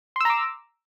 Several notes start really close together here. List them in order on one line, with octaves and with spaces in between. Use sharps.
C6 E6 A#5 D6